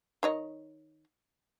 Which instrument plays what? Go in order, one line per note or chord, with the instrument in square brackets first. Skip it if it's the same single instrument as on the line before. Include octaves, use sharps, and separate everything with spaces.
[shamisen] D#3 C#5 D#5